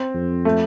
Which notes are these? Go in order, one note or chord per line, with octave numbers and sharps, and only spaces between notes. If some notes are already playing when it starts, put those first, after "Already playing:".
Already playing: C4
F2
A3